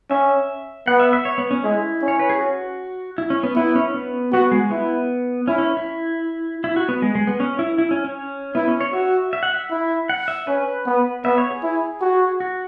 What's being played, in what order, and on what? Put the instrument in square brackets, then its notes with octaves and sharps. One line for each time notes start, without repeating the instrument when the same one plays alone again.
[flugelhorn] C#4 [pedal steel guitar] E5
[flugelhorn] B3 [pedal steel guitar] F#5
[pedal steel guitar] E5
E5
C#5
B3
C#4
[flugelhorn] G#3 [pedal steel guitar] E4
[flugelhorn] C#4
[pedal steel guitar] C#5
B4
G#4
F#4
E4
C#4
B3
[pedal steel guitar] B3 [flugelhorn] E4
[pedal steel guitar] C#4
B3
[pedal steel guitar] B3 [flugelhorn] F#4
[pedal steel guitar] G#3
[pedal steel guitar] B3 [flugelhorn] E4
[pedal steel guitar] C#4 [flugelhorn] E4
[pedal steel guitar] C#4
E4
E4
F#4
B3
G#3
G#3
B3
C#4
E4
E4
C#4
C#4
[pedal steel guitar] B3 [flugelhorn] E4
[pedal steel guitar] C#4
C#5
[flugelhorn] F#4 [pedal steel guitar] E5
[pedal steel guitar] E5
F#5
E5
[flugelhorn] E4
[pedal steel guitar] F#5
E5
[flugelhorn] C#4 [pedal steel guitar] B4
[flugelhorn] B3
[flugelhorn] B3 [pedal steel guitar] E5
[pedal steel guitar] C#5
G#4
[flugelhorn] E4
F#4
[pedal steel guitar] F#4